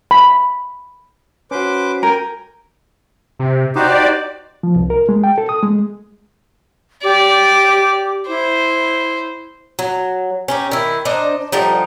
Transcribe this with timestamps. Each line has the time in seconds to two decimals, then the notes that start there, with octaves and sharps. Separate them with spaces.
0.11 B5
1.51 C#4 F#4 B4 C5 D6
2.03 A#4 G5 G#5
3.39 C3
3.75 D#4 F#4 G4 C5 D5
4.63 F3
4.76 C2
4.90 A#4
5.09 G#3
5.24 G5
5.38 A4
5.49 D#6
5.63 G#3
7.03 G4 D5 D6
8.28 E4 C5
9.79 F#3
10.48 C#4 D#4 G4
10.71 D#3 E4
11.05 D4 D#4 C5 D#5
11.52 D3 F3 G3 D#4